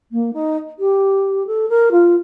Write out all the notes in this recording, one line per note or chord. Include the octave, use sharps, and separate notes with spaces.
A#3
D#4
G4
A4
A#4
F4